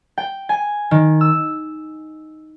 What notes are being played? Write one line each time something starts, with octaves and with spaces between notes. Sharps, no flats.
G5
G#5
D#3
E6